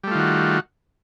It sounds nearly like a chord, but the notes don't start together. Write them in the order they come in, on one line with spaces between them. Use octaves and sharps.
G3 A3 F4 D#3 F#4